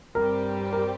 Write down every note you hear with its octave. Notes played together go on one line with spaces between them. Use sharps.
G2 G3 C4 G4 A#4
A#4